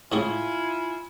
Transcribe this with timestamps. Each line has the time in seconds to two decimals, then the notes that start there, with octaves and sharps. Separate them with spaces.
0.12 A2 C#4 E4 F4 G#4 G#5